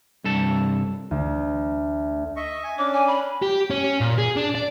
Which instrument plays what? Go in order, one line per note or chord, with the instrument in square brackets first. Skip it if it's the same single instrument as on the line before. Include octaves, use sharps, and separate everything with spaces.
[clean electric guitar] C2 G2 A4 A5
[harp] D2
[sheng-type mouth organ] D#5 E5 C#6
G#5
[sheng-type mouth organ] C#4 D4 [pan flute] D6
[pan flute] G#5
B5
[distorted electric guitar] G4
C#4
A#2
G#4
D4
D5